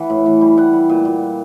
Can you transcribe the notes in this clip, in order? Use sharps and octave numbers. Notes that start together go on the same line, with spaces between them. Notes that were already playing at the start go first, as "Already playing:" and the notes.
Already playing: E3 F#5
A2
E3
G3
G3 F#5
G3
A#2
A#2